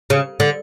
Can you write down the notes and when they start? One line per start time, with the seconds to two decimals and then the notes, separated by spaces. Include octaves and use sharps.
0.10 C#3
0.40 D3